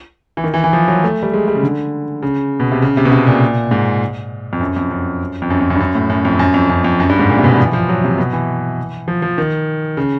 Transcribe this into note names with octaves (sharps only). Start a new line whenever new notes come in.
E3
D#3
E3
E3
F3
F#3
A3
G3
G#3
G3
C#3
D3
C#3
B2
C3
C#3
C3
B2
C3
A#2
G#2
F2
F#2
F2
F#2
F2
F#2
F2
F#2
G2
F#2
A2
F#2
F2
F#2
F2
F#2
F2
F#2
G2
G#2
A#2
C3
B2
F3
E3
F3
F#3
C3
B2
E3
F3
F3
D#3
C#3